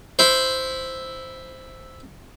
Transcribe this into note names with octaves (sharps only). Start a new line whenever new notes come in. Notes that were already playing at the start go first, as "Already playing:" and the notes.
E4 C5